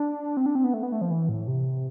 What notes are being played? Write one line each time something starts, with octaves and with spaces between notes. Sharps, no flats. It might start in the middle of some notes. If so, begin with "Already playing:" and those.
Already playing: D4
C4
D4
C4
B3
A3
B3
A3
F3
E3
A2
C3